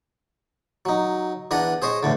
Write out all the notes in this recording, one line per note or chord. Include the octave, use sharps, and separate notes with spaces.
F#3 D#4
E2 D4 B4 F#5 A#5
G#4 C5 C#5 D#5
E2 A2 D3